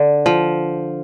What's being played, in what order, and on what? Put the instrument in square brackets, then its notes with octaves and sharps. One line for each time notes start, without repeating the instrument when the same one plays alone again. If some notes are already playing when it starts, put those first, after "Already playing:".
Already playing: [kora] D3
F3